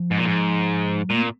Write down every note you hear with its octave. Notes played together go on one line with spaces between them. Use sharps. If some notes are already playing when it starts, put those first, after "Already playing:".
Already playing: F3
G#2
A#2
G#2
A#2
C4